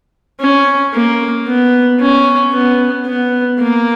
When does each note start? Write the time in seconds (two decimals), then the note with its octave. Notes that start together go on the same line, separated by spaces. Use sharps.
0.40 C#4
0.93 A#3
1.47 B3
2.00 C#4
2.53 B3
3.06 B3
3.59 A#3